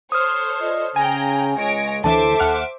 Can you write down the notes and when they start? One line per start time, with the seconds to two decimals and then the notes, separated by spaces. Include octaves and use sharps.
0.12 A4 C5 C#5 D#6 F6
0.62 F4 D5 D#5
0.96 C#3 G#4 G5 G#5 A#5
1.57 C#2 G#3 C#5 A#6 D7
2.04 D2 D3 E3 A4 C5 E5 A5 D6
2.40 D#2 F#5 F6